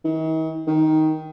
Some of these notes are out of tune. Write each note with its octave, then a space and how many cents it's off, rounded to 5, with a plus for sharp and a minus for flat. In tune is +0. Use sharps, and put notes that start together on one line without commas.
D#3 +45
D#3 +10